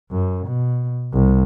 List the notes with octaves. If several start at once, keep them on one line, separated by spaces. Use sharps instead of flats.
F#2
B2
C2